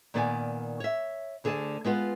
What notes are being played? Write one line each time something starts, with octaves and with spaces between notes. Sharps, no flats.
A#2 D#3 B3 D5 E5 G#5
C#5 E5
D2 D3 G#4 A#4 D5 A5
G#3 B3 F4 B4